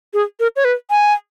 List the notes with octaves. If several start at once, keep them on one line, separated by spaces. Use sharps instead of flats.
G#4
A#4
C#5
B4
G#5